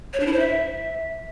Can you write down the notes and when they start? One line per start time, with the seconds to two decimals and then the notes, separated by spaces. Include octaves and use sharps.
0.13 C#5
0.20 D4
0.26 E4
0.33 C5
0.39 E5